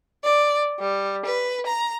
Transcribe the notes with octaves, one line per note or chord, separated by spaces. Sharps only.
D5
G3
B4
A#5